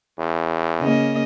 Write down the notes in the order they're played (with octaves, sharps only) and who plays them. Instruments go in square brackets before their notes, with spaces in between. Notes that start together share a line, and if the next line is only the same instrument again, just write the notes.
[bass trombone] E2
[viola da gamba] C#3 A#3 D#5